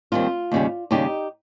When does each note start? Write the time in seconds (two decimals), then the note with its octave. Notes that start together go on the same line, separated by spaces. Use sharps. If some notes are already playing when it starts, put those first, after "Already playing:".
0.12 D#2 D#3 G3 C4 F4
0.52 D#2 C#3 G3
0.91 D#2 C#3 G3 D#4 G4